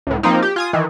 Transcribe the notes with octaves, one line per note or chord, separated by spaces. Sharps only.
C#2 A2
F3 A#3 C4 D#4
G4
F4 G#5 D#6
D#3 E3